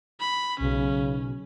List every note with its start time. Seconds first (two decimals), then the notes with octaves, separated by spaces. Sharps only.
0.20 B5
0.60 B1 C#3 C#4